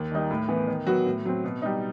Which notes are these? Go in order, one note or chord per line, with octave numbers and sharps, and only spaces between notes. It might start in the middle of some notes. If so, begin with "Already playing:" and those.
Already playing: D#2
D#3 G3 D#4
A2
E3 B3
D#3
F#3 B3 F#4
A2
F#3 C4
B2
G3 D#4